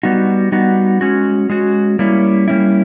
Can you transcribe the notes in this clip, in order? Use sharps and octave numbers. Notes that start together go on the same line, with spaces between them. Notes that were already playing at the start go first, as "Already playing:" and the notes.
G3 B3 D#4 F#4
G3 B3 D#4 F#4
G#3 C#4 F#4
G#3 C#4 F#4
G3 A#3 C#4 E4
G3 A#3 C#4 E4